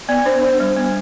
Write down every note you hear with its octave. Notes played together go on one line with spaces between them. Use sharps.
B3 D5
D4 C5
D4 C5
G3
B3